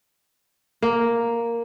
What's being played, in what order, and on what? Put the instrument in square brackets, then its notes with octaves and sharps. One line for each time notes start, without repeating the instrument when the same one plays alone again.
[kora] A#3